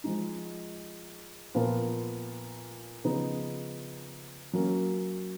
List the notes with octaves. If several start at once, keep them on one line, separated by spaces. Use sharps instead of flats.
F3 G#3 D#4
A#2 F3 B3 F4 A#4
C#3 F3 B3 D#4 G#4
F#3 A#3 C#4